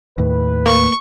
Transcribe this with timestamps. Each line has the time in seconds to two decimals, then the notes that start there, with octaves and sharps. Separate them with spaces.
0.18 D#2 A2 B4
0.66 A#3 C#6